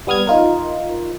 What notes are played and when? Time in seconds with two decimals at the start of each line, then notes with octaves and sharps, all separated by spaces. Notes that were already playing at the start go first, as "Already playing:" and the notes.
0.07 G3 B3 D#6 F6 G#6
0.27 D#4 F4 A#4